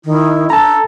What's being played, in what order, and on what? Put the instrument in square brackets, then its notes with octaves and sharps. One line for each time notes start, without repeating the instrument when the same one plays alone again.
[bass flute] D#3 [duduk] E4
[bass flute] D4 [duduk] A4 [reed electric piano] A5 A#5